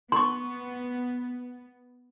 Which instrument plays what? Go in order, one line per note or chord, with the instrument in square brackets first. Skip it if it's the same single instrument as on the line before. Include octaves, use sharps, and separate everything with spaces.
[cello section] B3 [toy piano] C6 C#6